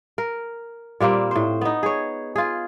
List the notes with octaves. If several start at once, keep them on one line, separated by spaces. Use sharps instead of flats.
A#4
A#2 G3 A#3 C4
A2 C5
B3 D#4
G#4 C#5
F4 G#4